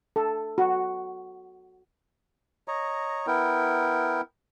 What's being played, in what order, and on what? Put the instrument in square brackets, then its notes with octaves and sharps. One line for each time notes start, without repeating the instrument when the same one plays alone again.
[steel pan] A4
F#4
[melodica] C#5 D#5 A#5
B3 E4 A#4 G5